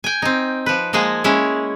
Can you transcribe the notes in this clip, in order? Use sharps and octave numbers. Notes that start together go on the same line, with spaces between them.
G5 G#5
C4 D#4
F3 B4
F3 G#3 A#3 G#4
G#3 C#4 E4